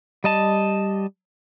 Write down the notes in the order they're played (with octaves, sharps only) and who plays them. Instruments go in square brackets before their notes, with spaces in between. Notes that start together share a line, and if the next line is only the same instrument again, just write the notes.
[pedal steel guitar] G3 D#5 A5